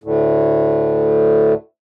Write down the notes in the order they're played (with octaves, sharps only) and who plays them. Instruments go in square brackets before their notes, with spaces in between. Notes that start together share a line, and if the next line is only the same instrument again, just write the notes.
[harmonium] D2 A2